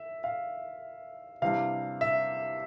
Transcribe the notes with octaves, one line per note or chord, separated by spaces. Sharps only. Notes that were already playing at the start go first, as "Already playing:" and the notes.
Already playing: E5
F5
C3 E3 G3 D4 F5
E5